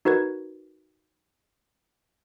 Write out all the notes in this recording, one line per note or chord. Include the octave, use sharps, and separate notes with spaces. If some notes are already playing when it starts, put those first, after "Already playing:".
D#4 F#4 A#4 B4 G#6